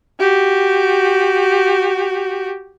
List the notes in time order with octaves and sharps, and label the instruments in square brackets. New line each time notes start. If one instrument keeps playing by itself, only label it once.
[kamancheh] F#4 G4